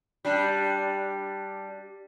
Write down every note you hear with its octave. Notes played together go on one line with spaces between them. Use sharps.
G3 D4